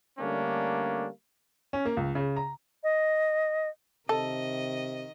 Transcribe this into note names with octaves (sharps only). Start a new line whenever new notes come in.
D3 G3 A3 A#3 C#4 D4
C#4
A#3
C#2
C#3
A#5
D#5
C3 D#3 A4 D#5